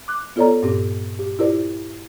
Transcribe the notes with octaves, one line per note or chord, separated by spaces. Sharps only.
D6 F#6
B3 F4 A4 C#5 D5 A#5
G2 A#2 C4 G4
G4
E4 F4 G4 A#4 C5 D5